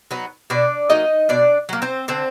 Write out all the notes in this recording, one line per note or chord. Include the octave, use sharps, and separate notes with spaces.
F#3 B3 D#4
B2 D4 D5
F#3 A#3 D#4 D#5
B2 D4 D5
F#3 A#3
C4 C5
D3 C4 C5